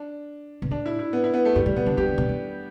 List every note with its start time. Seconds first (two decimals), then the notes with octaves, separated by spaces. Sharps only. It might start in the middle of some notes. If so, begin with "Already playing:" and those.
Already playing: D4
0.62 B2
0.71 A2 D4
0.86 E4
0.99 E4
1.13 B3
1.24 E4
1.34 B3
1.45 A3
1.55 G2 G3
1.66 A2 G3
1.76 B2 B3
1.86 D3 D4
1.97 E3 G4
2.08 D3
2.18 B2
2.29 E3